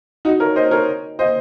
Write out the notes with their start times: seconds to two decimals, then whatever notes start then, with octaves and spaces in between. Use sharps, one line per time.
0.25 D#4 F#4
0.40 A#4 C#5
0.56 C5 D#5
0.71 A#4 C#5
1.19 C5 D#5